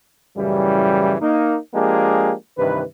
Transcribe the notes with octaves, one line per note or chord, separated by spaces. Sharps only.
F#2 A2 C#3 E3 G3
A#3 D#4
F3 G#3 A#3 D4 G4 G#4
G2 C3 D#3 E3 B4